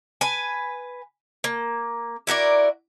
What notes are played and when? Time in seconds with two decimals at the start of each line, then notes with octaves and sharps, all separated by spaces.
0.21 B4 G#5
1.44 A#3
2.27 E4 F#4 A#4 D5